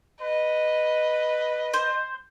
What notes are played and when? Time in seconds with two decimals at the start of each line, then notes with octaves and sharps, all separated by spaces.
0.21 B4 D#5
1.74 C5